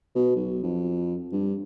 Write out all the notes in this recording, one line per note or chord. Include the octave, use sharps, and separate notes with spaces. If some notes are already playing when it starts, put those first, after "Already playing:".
B2
B1
F2
G2